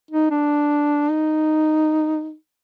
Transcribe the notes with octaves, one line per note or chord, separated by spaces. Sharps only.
D#4
D4
D#4